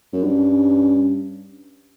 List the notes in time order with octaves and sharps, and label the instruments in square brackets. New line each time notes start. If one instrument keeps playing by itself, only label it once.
[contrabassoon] F#2
[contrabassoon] G2 [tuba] C#4